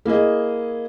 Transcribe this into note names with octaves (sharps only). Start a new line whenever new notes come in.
A#3 E4 G#4 D#5